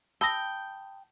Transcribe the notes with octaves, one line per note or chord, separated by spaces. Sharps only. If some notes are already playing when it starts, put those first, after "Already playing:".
G5 A5 B5 D#6 E6 A#6